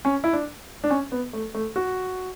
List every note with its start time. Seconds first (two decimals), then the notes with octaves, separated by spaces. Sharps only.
0.05 C#4
0.24 E4
0.33 D4
0.84 D4
0.91 C#4
1.12 B3
1.33 A3
1.55 A3
1.76 F#4